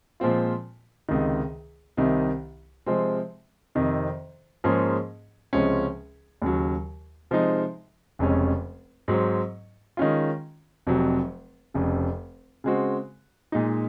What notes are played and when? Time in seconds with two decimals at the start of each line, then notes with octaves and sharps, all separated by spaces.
0.20 A#2 F3 G#3 C4 F4
1.09 C#2 C3 D#3
1.97 C2 C3 D#3
2.86 C3 F3 G#3 C4
3.75 F2 C3 D#3
4.64 G#2 F3 A#3 C#4 G#4
5.53 C#2 C3 F3 G#3 C#4
6.42 D#2 C#3 F#3
7.31 C3 F3 G#3 D#4
8.19 F1 F2 C#3 G#3 C#4
9.08 G#2 F#3 C4
9.97 D#3 G#3 C#4 F4
10.87 F1 F2 C3 F#3
11.74 F1 F2 C#3
12.64 C#3 G#3 C4 F#4
13.52 A#2 G#3 D#4